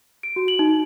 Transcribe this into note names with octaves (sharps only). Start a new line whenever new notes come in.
D7
F#4
F#7
D#4